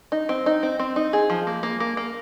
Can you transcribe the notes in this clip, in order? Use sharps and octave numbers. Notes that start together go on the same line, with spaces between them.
D#4
C4
D#4
C4
C4
D#4
G#4
F3
A#3
A#3
A#3
A#3